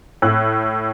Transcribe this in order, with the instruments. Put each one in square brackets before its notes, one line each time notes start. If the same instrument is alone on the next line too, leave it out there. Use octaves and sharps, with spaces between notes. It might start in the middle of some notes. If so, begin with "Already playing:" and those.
[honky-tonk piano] A2 F#6